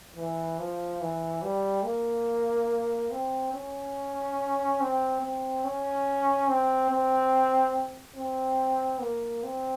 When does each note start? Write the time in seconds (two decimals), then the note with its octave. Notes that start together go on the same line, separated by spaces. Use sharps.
0.16 E3
0.59 F3
1.01 E3
1.42 G3
1.84 A#3
3.11 C4
3.54 C#4
4.80 C4
5.21 C4
5.65 C#4
6.48 C4
6.90 C4
8.16 C4
9.01 A#3
9.43 C4